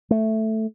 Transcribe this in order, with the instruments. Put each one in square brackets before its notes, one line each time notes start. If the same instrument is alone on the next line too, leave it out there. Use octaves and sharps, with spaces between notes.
[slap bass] A3